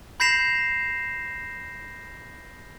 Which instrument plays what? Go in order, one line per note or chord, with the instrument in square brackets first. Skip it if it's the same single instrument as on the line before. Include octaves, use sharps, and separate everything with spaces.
[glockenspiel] B5 G6 A#6 C7 E7 F7